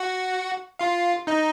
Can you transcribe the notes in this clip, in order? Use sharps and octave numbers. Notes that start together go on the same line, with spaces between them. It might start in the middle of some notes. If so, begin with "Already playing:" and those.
Already playing: F#4 F#5
F4 F5
D#4 D#5